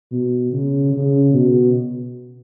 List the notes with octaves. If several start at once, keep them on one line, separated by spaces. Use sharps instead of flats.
B2
C#3
C#3
B2